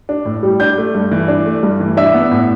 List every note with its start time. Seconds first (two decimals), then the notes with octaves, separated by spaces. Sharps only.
0.09 D4
0.25 A2
0.43 G3
0.60 D4 G6
0.78 A3
0.95 G2
1.11 E3
1.28 D4
1.46 A3
1.63 G2
1.80 E3
1.97 D4 E5
2.14 B3
2.31 A2